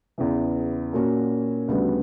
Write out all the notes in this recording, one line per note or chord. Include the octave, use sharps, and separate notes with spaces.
E2 C#3 E3
A#2 A#3 C#4 F#4
D2 C#3 G3 B3 F#4